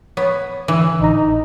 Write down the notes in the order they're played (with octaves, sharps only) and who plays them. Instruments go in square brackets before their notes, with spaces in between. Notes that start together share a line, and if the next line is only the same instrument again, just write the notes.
[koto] B3 [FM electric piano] C#5
[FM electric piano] D3 E6 [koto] E3
[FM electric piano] A1 A#5 [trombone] D#4